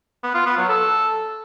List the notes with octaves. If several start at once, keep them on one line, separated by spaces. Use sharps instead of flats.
B3
F4
B3
F#3
A4